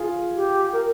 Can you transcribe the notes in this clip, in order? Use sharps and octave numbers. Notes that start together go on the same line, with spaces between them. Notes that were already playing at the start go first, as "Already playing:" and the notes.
Already playing: F4 G#4
G4
A#4